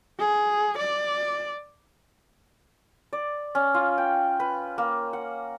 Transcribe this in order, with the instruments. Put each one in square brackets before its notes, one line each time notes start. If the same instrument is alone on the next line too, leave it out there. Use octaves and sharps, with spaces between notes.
[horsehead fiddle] G#4
D5
[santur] D5
C#4
F4
G5
B4
A#3
F#5